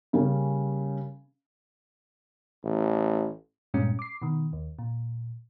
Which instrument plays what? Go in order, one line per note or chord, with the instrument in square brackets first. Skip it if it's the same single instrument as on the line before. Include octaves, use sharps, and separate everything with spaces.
[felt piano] C#3 G3 A#3 C#4
[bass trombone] A1
[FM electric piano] G2 A#2 G3 G#3 C#4
D6 C7
B2 D#3
D#2
A#2